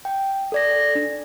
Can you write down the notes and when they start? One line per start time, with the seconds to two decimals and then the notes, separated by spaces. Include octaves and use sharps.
0.05 G5
0.52 A4 D5 A#6
0.95 D4